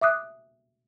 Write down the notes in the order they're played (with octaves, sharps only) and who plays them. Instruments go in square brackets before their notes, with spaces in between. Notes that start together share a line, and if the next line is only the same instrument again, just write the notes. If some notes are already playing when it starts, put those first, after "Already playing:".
[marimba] E5 D6 D#6 F#6